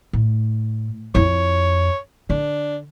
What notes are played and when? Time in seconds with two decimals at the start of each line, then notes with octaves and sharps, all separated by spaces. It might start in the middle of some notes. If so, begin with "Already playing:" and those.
0.13 A2
1.15 F2 E4 C#5
2.30 D3 D4